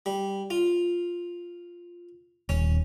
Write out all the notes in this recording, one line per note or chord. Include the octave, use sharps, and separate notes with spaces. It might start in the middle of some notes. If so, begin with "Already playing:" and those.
G3
F4
D#1 C#4